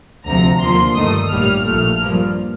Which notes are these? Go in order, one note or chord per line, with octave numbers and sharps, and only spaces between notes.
D2 C3 F3 A#5
D#2 D3 F3 A#3 C6
G2 D#3 A3 D#6
A#1 A2 G3 A#3 F6
A#1 A#2 A3
G2 F3 A#3